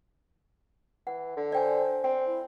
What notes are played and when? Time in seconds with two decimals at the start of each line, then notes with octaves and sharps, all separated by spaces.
1.07 E3 F#5
1.36 D3
1.52 C5 D5 G5 G#5
2.04 C4 G5
2.26 E4